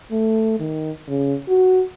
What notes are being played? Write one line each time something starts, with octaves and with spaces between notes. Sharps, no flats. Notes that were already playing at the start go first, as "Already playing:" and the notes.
A3
D#3
C#3
F#4